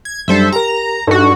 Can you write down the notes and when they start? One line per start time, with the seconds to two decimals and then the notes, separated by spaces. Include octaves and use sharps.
0.05 G#6
0.28 F#2 G3 D4 A4 C5 E5
0.52 G4 A#4 A#5
1.07 G2 D#4 F#4 A4